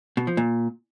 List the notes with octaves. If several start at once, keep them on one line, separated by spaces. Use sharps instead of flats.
B2
F3
A#2